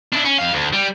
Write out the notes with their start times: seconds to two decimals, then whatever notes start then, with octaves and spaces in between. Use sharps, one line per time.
0.13 D4 E4
0.25 C#4
0.39 F2 F5
0.53 D2
0.73 G3